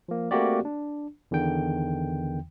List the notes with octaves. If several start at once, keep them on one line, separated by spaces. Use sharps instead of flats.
F3 A#3
A3 A#3 C4 F#4 G4 D5
D4
E2 D3 D#3 G5